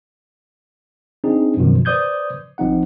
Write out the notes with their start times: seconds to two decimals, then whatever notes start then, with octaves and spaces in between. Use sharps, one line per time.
1.24 C4 D4 D#4 G#4
1.57 F#2 B2 D#3 F3
1.85 B4 C5 D5 D#6 G6 G#6
2.58 A1 F3 C4 D#4 F#5